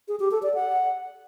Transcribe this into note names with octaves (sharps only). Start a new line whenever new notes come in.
G#4
G4
A4
D5
F#5